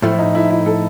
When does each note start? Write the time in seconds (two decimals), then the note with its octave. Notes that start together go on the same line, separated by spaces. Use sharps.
0.02 A2 F3 A3 E4
0.19 D#4
0.35 E4
0.50 E4
0.66 A4